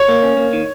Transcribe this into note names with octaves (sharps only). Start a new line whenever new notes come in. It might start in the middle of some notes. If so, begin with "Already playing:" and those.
Already playing: C#5
A#3
C#4
A#3
D#3